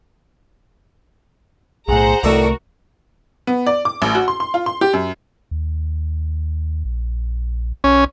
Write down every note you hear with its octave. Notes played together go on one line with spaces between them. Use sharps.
B1 A2 G#4 C5 F#5 A#5
C2 A2 D#3 A3 D4 F#4 A4 A#4
B3
D5
D6
A1
F#4
C6
C6
F4
C6
G4
F#2
D#2
A#1
B1 C#4